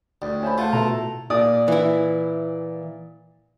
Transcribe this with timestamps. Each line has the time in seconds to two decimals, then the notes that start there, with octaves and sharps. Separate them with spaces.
0.22 D2 G3
0.43 C#4 E4 C5 B5
0.58 A3 F4 F5 F#5 A5
0.73 B2 E4 A4 A#5
1.30 A#2 D5 D#6
1.68 E3 E4